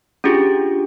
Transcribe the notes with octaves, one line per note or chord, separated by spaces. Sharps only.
C#4 D4 F4 G4 G#4